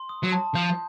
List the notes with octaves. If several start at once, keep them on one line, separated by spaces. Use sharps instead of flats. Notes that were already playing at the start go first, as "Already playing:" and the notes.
Already playing: C6
D#6
F#3
A5
F3 G6